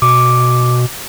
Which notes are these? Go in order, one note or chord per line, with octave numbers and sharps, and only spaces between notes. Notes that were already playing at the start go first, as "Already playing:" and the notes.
B2 D6